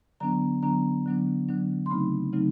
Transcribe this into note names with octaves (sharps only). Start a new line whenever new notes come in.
D3 F#3 B3 D4 A#5
D3 F#3 B3 D4 A#5
D3 F#3 B3 D4
D3 F#3 B3 D4
C6
C#3 F#3 A3 C4 D#4 B5
C#3 F#3 A3 C4 D#4